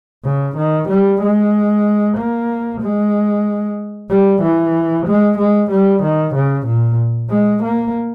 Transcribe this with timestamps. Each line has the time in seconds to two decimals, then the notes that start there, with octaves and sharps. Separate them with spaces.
0.24 C#3
0.57 D#3
0.89 G3
1.22 G#3
2.17 A#3
2.81 G#3
4.10 G3
4.42 E3
5.06 G#3
5.38 G#3
5.71 G3
6.03 D#3
6.35 C#3
6.66 A#2
7.30 G#3
7.63 A#3